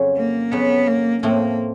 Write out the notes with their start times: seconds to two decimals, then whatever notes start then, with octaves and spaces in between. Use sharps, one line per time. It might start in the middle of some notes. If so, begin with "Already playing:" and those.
Already playing: F2 C#3 F#3
0.17 A#3
0.52 F2 C#3 F#3 B3
0.88 A#3
1.23 A2 F3 A3 A#3 C4